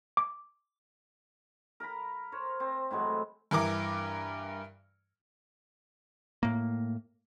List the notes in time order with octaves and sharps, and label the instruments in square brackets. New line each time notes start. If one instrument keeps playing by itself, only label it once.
[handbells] D6
[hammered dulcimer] A#4 F5 A#5 B5
A#4 C5 C#5
C4
A2 E3 F#3 G#3
[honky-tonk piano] G2 E3 A#4 D6
[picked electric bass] A2 A#3